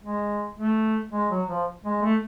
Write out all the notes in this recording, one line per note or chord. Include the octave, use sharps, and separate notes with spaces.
G#3
A3
G#3
F#3
F3
G#3
A3